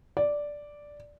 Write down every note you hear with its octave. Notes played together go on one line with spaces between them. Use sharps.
D5